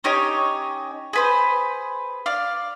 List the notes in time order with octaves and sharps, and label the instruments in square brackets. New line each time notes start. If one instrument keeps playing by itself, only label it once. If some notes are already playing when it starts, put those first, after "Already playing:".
[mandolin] C#4 D#4 G4 C#5
G#4 B4 C5
D5 F5